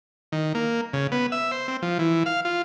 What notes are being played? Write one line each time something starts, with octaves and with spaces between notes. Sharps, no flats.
D#3
A#3
C#3
B3
E5
C5
C4
F3
E3
F5
F4